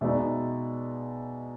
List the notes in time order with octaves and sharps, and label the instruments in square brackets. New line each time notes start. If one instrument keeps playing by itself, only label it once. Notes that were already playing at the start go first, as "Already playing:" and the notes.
[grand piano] B2 G#3 B3 D#4 D5 E5